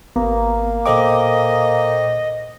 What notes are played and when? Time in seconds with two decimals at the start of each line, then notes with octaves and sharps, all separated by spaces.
0.16 G#1 A#3 B3 A#5
0.86 A#2 A4 C5 D#5 G5 D6